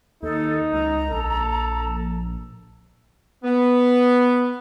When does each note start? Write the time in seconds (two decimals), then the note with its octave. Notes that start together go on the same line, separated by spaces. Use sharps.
0.23 D#2 D#4 A4
0.73 C#2 A#5
1.10 A#1 A4
3.44 B3